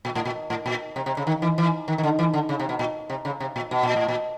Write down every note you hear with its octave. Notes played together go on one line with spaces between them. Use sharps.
A#2
A2
A#2
A2
A#2
C3
C3
C#3
D#3
E3
E3
D#3
D#3
D3
E3
D3
C#3
C3
B2
A#2
C3
C#3
C3
A#2
B2
A#2
A2
A#2